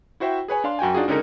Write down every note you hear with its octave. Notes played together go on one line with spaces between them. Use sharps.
E4 F#4 C5 E5 G5
G#4 B4 C#5 G#5
D4 F5 C6
F#2 F#4 G5 G#5
D4 D#4 F4 F#4 G#4
C#2 D3 C#4 D#4 G#4 A#4